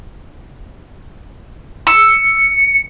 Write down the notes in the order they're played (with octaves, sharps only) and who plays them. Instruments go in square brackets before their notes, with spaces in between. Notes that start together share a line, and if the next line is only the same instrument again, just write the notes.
[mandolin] E6 [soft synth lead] C#7